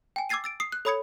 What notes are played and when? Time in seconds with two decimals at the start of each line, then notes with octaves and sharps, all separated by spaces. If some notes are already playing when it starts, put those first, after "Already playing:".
0.16 G5 G#5
0.29 D6 E6 G#6 A6 C7 D#7
0.44 E6 A6 D7
0.60 D#6 C7
0.72 F#6
0.85 A4 C#5 B5 D#6 G#6 C#7